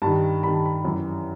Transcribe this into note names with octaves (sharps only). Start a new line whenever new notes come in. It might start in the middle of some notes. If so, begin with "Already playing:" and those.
G2 D#3 A5
G2 D#3 B5
A5
B5
F#2 E3